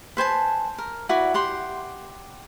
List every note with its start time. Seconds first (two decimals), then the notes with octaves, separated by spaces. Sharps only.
0.17 B4 C5 G#5 A5
0.78 A#4
1.09 E4 F#4 B4 D5
1.34 G4 F#5 C6